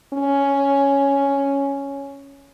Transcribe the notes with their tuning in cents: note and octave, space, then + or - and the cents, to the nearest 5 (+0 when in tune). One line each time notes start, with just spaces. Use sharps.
C#4 +5